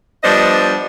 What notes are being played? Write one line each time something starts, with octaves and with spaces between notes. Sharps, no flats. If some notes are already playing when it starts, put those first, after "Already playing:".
F3 G3 B3 D4 C5 D#5